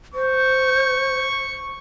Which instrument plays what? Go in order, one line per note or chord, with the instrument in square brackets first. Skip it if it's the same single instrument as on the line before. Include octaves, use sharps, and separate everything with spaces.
[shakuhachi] C5 [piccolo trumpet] C#6